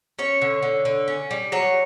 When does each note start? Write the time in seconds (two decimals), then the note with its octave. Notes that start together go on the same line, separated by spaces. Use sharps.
0.19 C#4 C#5
0.41 D3
0.63 D3
0.85 D3
1.08 C#4
1.31 G3
1.52 F#3 C#5